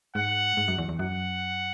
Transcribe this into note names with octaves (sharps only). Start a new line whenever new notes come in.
G#2 F#5
G#2
F#2
E2
E2
F#2 F#5